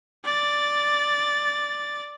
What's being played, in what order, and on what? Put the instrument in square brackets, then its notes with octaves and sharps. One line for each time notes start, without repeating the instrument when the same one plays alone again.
[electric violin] D5 A6